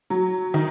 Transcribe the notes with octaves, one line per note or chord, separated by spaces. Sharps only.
F#3
D#3